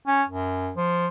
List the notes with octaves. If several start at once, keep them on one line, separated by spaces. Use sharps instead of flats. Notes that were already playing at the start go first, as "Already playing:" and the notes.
C#4
F#2
F3